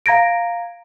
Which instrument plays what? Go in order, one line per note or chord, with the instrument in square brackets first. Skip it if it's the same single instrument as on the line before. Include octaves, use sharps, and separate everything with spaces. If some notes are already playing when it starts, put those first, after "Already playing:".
[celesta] F5 A#5 G#6 A#6 D7